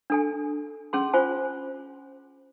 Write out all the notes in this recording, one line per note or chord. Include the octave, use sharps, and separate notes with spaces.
D4 A4 G#5
C#4 G#4 C6
F4 C5 G#5